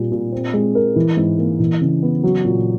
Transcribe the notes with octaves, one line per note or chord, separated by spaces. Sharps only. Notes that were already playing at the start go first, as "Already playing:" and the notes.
Already playing: A#2 G3
A#2
C4
G#3
A#4
E3
G#2
A#3
E3
C#3
B3
F#3
A#2